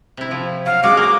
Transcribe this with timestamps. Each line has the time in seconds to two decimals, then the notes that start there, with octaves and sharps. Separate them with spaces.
0.17 C3 E4
0.31 F3
0.66 F#3 F5
0.84 G#3 F#4 D6
0.97 A#3 A#4